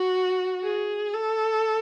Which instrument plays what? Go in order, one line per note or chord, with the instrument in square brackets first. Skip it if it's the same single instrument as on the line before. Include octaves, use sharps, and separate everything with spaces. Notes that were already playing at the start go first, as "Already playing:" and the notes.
Already playing: [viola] F#4
G#4
A4